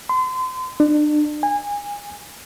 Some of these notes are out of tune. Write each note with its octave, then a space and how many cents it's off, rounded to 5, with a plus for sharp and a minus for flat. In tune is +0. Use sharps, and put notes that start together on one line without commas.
C6 -35
D4 +35
G#5 -25